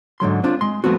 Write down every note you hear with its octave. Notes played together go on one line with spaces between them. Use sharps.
G#2 D3 F#3 C6
C4 D4 F4
G#3 C6
F3 A3 B3 C4 F#4